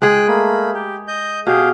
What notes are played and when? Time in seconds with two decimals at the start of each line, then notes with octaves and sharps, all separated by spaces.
0.02 G#3 G#4 G5 F#6
0.28 A3 A#3 B5
0.74 G4
1.08 D#5 G6
1.47 B2 G4 G#4 F5